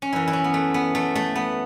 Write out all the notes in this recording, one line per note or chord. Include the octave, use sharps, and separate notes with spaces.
C#4
F#2 E3 E4
E4
C#4
B3
A3
B3
A3
A3
B3